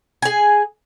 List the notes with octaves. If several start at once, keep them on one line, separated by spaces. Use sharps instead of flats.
G#4 G#5